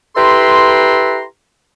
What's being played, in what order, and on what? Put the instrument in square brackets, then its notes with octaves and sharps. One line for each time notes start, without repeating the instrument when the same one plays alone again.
[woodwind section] E4 G4 A4 B4 A#5 C6